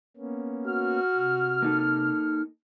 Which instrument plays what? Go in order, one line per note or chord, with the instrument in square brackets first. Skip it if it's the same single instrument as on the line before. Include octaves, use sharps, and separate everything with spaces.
[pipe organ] A#3 B3 C#4
[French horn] F#4 [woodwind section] F6
[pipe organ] C3
[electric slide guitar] A#3 D#4 A4